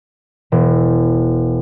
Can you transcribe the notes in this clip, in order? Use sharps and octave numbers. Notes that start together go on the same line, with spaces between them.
E1